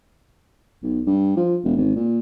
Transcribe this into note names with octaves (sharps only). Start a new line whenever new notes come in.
B1
G2
F3
E1
G#1
A#2